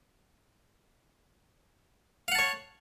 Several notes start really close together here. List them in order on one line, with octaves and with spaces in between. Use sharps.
F5 F#5 A5 C#5